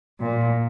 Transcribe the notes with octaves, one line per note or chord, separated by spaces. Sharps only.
A#2